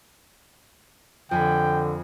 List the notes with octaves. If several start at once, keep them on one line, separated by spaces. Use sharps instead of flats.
F2 D3 G5 G#5 B5